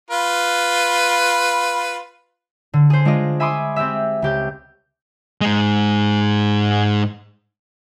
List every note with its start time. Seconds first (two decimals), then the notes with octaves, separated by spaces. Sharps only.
0.11 F4 B4
2.73 D3
2.90 G#4 C5
3.05 G#3 D4 F4 D5 D#5
3.40 E5 G#5 B5 C6 D6 D#6
3.76 C4 G4 G#4 E5
4.22 C#2 G4 G6
5.41 G#2 G#3